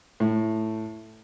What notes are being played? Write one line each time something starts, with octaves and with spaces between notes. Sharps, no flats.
A2